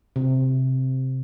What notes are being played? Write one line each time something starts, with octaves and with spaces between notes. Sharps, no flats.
C3